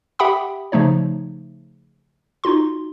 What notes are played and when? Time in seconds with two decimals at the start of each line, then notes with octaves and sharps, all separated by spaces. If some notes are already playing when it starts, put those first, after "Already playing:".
0.19 G4 E5 F#5 G5 B5 D#6
0.72 C#3 F3 A3 D#4 C#5
2.44 D#4 F4 F#4 C6